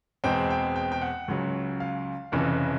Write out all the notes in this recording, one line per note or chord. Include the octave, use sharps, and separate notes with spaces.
E2 B2 G#3 C4 G5
G5
G5
G5
F#5
C#2 C#3 F#3
F5
F1 F2 C#3 E3